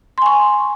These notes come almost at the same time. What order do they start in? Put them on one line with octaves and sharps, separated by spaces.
C6 G#5 C#6